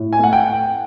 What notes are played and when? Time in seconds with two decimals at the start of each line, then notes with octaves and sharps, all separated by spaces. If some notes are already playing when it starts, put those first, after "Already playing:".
Already playing: A2
0.13 G#5
0.19 A3 F#5
0.33 G5